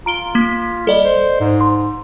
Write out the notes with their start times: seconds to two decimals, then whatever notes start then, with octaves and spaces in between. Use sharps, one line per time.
0.06 F4 A#5 D7 G7
0.35 A#3 B6
0.87 G3 A4 D5 D#5
1.04 C5
1.41 G#2
1.61 C6